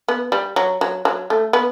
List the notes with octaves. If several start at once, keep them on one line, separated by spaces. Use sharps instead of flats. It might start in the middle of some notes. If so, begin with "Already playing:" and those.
B3
G3
F#3
F#3
F#3
A3
B3